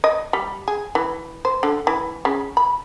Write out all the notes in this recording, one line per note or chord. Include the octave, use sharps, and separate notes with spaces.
D#5
G3
G#4
E3
C5
D3
E3
C#3
B5